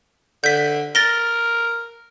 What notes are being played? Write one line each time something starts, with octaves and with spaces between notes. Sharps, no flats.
D3 G6 B6
A#4 A6 A#6 G7